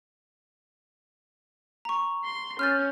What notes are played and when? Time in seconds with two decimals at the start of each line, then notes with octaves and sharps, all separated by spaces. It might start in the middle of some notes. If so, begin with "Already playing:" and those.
1.85 A#5 C#6
2.24 C6
2.59 C#4 F6 G6 A6